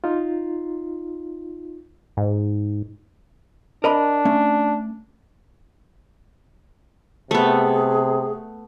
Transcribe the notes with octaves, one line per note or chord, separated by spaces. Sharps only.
D#4 F4
G#2
D4 A#4 D#5 B5
A3 C#4
C3 A3 B3 G#4